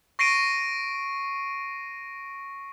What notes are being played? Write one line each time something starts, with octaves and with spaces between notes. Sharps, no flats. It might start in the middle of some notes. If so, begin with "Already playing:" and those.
C#6 A#6 C7 D7 D#7